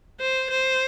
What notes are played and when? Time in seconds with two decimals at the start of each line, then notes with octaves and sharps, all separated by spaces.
0.20 C5
0.50 C5